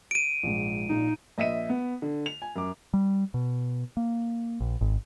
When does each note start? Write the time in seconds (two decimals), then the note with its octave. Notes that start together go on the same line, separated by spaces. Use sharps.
0.11 D7 D#7
0.43 A#1 G#2
0.89 A#1 A#2 D#4
1.38 A#1 D#5 E5 B6 D#7
1.69 B3
2.02 D3
2.26 F7
2.42 G#5
2.56 F#2 D6
2.94 G3
3.34 B2
3.97 A#3
4.61 A#1
4.81 G#1